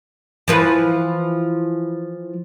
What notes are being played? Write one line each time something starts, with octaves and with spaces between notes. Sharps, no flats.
E3 F3 B4